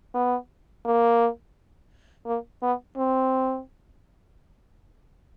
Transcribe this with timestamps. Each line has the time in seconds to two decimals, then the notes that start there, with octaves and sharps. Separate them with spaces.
0.14 B3
0.85 A#3
2.26 A#3
2.63 B3
2.97 C4